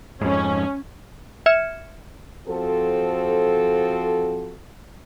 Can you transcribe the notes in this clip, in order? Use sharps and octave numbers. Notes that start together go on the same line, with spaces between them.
F2 G#2 C#4
E5 F6 G#6 C#7 E7
F3 C4 F#4 A4